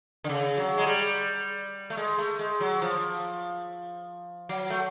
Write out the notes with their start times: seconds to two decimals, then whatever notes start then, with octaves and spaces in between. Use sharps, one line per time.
0.24 D3
0.29 C#3
0.57 F#3
0.78 G#3
0.86 G3
1.90 A3
1.97 G#3
2.18 A3
2.39 G#3
2.61 F#3
2.82 F3
4.49 F#3
4.70 A3